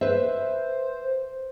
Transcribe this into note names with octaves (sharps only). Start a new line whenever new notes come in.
B4 C5 E5